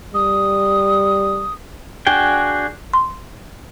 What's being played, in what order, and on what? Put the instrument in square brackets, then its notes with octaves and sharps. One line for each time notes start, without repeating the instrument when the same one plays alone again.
[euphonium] G3 [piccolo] D#6
[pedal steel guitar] D4 F#4 G#4 G5
[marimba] C6